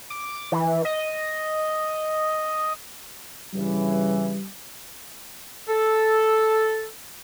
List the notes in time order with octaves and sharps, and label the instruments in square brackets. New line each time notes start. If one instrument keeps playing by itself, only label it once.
[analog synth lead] D6
E3
D#5
[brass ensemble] G2 C#3 E3 [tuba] G3
[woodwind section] A4